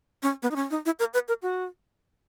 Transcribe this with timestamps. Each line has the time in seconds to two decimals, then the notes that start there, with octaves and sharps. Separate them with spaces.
0.23 C#4
0.43 B3
0.51 D#4
0.56 C#4
0.71 D#4
0.86 E4
0.99 A#4
1.14 B4
1.28 A#4
1.42 F#4